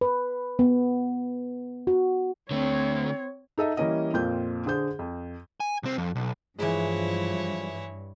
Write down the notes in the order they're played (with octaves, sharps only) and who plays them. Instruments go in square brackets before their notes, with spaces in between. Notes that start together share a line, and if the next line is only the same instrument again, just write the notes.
[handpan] B4
B3
F#4
[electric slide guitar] D3 A3 [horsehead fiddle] C4 C#5
[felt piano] D#4 A4 D#5 E5
E3 G3 A#3 C#4 E4 D#5
F2 A#2 C4 F4 G6
D3 G#4 C5 G6
F2
[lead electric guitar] G#5
C2 C4
F2
B1
[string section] G2 [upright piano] E3 G#3 [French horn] F3 [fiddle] E4 C#5